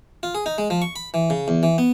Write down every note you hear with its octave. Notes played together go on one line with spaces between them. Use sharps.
F4
G#4
D#4
G#3
F3
C#6
B5
E3
C#3
E2
E3
B3